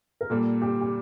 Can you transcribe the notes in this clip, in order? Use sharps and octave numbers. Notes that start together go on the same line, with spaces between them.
A#4
A#2 G3 A#3 A4
G4
G4